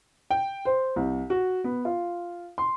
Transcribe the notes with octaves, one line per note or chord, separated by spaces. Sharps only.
G5
C5
C2
F#4
B3
F4
C6